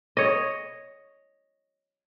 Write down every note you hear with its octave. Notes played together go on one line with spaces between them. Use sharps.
C#5 D#5